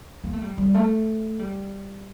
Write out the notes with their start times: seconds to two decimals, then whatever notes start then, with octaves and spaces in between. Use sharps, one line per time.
0.24 A#3
0.33 A3
0.42 G3
0.58 G3
0.74 A3
1.39 G3